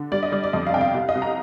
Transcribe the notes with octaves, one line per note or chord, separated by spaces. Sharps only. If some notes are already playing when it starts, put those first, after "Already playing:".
Already playing: D3
G3 D5
D#5
G3 D5
D5
F2 D#5
F5
C3 G5
F5
C2 F5
D#5
C2
A#5